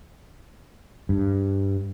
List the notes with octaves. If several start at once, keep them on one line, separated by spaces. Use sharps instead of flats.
G2